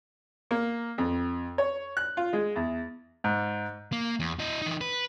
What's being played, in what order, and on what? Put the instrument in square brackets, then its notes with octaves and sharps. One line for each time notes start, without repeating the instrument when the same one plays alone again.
[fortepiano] A#3
F2
C#5
F#6
F4
G#3
E2
[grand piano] G#2
[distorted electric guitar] A#3
E2
E4 D#5
E3 D#4
B4